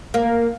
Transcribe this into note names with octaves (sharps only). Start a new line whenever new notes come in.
A#3